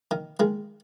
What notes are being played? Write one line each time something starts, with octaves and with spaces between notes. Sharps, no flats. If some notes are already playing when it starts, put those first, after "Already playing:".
D#3
D#3 G#3